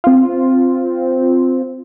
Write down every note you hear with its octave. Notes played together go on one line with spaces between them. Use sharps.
C4 F4